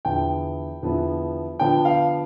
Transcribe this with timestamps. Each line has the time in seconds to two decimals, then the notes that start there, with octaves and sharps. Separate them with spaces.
0.05 E2 D3 F3 B3 E4 G5
0.82 E2 D3 F3 B3 E4
1.59 D3 F3 B3 D4 G5
1.85 F5